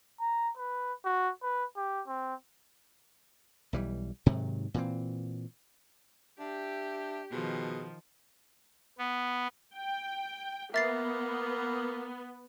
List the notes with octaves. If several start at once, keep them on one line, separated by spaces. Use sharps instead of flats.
A#5
B4
F#4
B4
G4
C4
B1 E3 G3
G#2 C3 D#3 F#3
A#2 E3 C4
D4 G4 E5
B2 D#3 F3 G#4
B3
G5
A#3 B3 E5 A6 C7